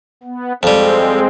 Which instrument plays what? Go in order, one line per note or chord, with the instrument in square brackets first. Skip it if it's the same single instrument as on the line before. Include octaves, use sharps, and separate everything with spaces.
[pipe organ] B3
[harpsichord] F2 G3 [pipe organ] G#3 C4